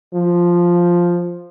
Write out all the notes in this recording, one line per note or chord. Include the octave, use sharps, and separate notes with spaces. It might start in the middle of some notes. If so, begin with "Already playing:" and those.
F3